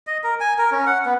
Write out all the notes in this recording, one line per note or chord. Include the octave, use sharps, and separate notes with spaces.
D#5
A#4
G#5
A#4
C#4
F#5
B3